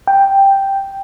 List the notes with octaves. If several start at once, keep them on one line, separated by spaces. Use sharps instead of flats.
G5